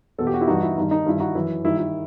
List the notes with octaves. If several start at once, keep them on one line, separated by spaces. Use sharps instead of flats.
E2 B2 A4
G4
F#4
E4 G4
G2 E3 D#4 F#4
E4
G2 D#3 D#4
D#4
G2 D#3 E4
D#4 F#4
F#2 E3 E4
G2 D#3 E4
E4